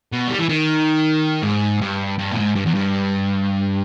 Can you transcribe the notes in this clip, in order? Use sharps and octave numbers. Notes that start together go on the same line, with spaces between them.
B2
G3
E3
D#3
G#2
G2
G2
A#2
G#2
G2
E2
G2